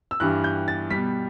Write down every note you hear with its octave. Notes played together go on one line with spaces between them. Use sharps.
E6
G2 E3 G3 F#6
G6
A6
B2 G3 B6